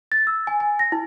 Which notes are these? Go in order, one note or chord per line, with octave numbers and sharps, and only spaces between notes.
A6
E6
G#5
G#5
A#6
E4